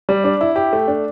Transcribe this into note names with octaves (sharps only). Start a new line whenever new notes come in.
G3
D4
E4
G4
A3
D4